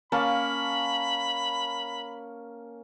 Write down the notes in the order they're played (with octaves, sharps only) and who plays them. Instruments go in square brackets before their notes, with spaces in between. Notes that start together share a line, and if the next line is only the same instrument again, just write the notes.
[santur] A#3 C#4 A5 [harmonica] B5